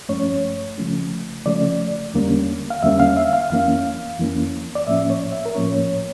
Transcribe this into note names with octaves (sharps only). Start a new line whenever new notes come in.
G2 F3 A3 C#4 C#5
C#3 F3 A3 C#4
C#3 F3 A3 C#4 D5
E2 D3 G3 A#3 C#4
F5
E2 D3 G3 A#3 C#4 E5
F5
E5
F5
F2 E3 A#3 C#4 F5
F2 E3 A#3 C#4
D5
A2 F3 A#3 C#4 E5
C#5
E5
A#4
A2 F3 A#3 C#4 C#5